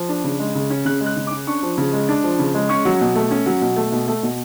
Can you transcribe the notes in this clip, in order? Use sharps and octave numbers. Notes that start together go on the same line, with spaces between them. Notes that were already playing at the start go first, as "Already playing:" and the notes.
Already playing: F3
D4
C#3
G#3
C#3
C#4
C#3 F#6
G#3
F#6
C#3
D6
C#4
D4 C#6
F3
C#3
G#3
D4
F3
C#3
G#3
C#4 C#6
F#3
B2
A3
C#4
F#3
B2
A3
B2
A3
B2